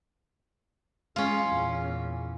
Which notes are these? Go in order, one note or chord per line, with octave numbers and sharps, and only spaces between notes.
G#3 C#4 F4
E2 A#2